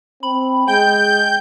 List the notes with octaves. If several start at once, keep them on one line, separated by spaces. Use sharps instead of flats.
C4 B5
G#3 G5 G6